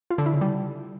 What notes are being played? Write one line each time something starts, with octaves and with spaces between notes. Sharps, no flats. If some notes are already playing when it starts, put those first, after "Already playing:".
F4
D3
E4
C#3
G3